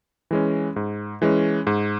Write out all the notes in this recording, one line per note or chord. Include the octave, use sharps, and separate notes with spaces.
E3 G#3 C#4
G#2
E3 G#3 C#4
G#2